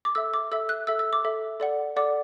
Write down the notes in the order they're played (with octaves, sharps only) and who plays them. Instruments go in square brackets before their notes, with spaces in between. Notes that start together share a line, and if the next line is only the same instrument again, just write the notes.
[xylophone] D6
A4 E5 E6
D6
A4 E5 E6
F#6
A4 E5 E6
E6
D6
A4 E5
A4 D5 F#5
A4 D5 F#5 D6